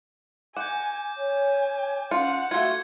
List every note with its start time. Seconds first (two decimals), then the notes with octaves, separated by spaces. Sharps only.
0.57 F#5 G#5 D6 G6
1.17 C#5 G#5
2.11 C#4 F4 F#5 C#7
2.51 A3 F4 F#4 G#6 C#7